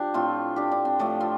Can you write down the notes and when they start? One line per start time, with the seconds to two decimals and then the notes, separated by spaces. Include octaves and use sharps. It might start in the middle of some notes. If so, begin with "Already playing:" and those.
Already playing: F3 D4 G4
0.14 A2 A3 C4 F4
0.56 D4 G4
0.72 D4
0.85 C4
0.99 A2 F3 A3 D4
1.20 C4 F4